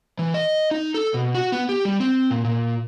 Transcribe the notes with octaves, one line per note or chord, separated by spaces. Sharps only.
E3
D#5
D#4
A4
B2
F#4
B3
G4
G3
C4
A#2
A#2